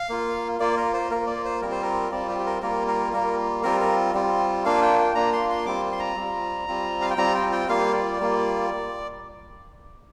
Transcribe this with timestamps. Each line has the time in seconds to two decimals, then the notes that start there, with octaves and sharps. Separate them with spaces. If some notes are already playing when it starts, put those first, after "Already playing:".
Already playing: F5
0.09 A#3 F4
0.60 A#3 F4 D5
0.77 A#4
0.93 C5
1.11 A#3 F4 A#4
1.27 D5
1.45 C5
1.62 G3 C4 F4 A#4
1.71 C5
1.82 A#4
2.12 G3 C4 F4 D5
2.29 G4
2.40 G4
2.46 A#4
2.62 G3 A#3 F4 A#4
2.88 A#4
3.13 G3 A#3 F4 A#4
3.63 G3 C4 F4 A#4
3.81 A#4
4.14 G3 C4 F4
4.65 A#3 D4 F4 F5
4.82 G5
4.99 G5
5.15 A#3 D4 F4 A#5
5.33 C6
5.50 C6
5.66 G3 C4 F4 D6
5.92 C6
5.99 A#5
6.16 G3 C4 F4
6.68 G3 C4 F4
7.02 F5
7.11 G5
7.18 G3 C4 F4 A#5
7.35 G5
7.52 G5
7.68 G3 A#3 F4 F5
7.94 D5
8.20 G3 A#3 F4